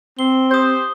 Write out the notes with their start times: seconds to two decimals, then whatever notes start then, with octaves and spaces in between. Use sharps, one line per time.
0.19 C4 G7
0.51 G4 C5 D#6 G6